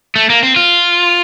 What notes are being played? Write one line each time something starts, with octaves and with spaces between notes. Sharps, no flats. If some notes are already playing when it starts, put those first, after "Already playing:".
A3
A#3
C4
F4